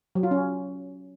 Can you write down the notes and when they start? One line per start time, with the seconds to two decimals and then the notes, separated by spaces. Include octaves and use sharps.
0.15 F#3
0.23 F4
0.31 C#4